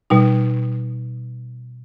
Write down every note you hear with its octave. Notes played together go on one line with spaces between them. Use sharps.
B2 G3 D#4